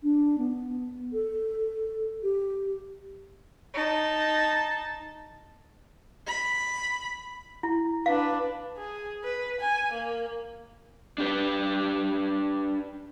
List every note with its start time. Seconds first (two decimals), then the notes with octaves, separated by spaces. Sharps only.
0.03 D4
0.38 B3
1.13 A4
2.23 G4
3.74 D#4 A5
6.27 B5
7.63 E4
8.06 D4 B4 F5
8.77 G#4
9.24 B4
9.60 G#5
9.92 A#3
11.18 D4 G4 B4